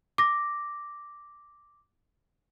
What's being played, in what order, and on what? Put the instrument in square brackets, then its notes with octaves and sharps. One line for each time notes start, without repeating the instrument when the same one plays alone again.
[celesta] D6 A#6